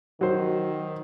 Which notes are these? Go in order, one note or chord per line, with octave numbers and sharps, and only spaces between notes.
D#3 F#3 C5